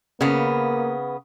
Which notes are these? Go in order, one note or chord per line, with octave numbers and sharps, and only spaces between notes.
C#3 A#3 B3